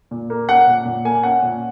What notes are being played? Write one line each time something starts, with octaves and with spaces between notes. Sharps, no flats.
A#2
A#3
C#4 F#5
A#2
A#2
A#3 G#5
C#4 F#5
A#2